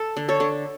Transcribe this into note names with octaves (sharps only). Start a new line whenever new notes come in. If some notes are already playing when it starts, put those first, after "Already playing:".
Already playing: A4
D3
A4 C#5
D3